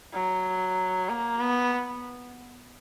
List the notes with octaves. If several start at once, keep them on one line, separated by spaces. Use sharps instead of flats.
F#3
A#3
B3